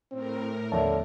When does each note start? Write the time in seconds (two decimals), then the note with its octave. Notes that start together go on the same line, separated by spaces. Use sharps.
0.11 A2 C4 A#4
0.72 D#2 D3 F3 B3 C#5 E5 A5